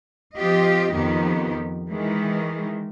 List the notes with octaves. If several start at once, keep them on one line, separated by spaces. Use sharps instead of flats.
F3 C4 F4 G4 D#5
F2 D#3 B3 G4
D#3 E3 G#3